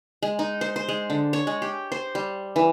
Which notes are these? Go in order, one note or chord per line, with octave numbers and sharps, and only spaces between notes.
G#3
D#4
C5
C5
G#3
D3
C#5
G#3
G4
C5
G3
E3